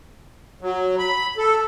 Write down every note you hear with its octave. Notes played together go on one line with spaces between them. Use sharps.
F#3
B5
A4